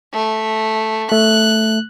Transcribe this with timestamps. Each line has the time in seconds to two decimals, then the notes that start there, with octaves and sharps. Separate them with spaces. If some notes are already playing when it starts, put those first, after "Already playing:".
0.14 A3
1.12 A3 F#6